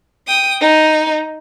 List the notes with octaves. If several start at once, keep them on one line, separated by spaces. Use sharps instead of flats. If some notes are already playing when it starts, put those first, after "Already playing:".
G5 D#6
D#4